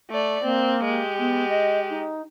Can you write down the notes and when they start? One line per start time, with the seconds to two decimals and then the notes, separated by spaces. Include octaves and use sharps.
0.11 A3 D5
0.44 A#3 C4
0.85 G#3 G4
1.19 B3
1.49 D#5
1.90 D#4